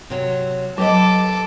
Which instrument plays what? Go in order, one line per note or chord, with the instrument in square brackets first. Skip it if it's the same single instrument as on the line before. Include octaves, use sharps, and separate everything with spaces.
[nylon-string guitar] C3 F#3
[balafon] F#3 [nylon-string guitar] G4 B4 D#5 [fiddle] A4 D6